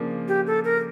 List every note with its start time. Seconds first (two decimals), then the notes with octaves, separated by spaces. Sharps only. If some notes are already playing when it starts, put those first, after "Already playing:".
Already playing: C#3 F3 A#3 D4
0.28 G4
0.47 A4
0.64 A#4